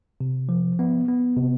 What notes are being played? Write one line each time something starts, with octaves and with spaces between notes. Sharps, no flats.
C3
F3
B3
B3
C3